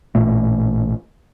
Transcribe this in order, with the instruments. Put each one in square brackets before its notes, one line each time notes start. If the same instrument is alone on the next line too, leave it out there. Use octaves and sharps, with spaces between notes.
[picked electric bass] A1 A#2 A3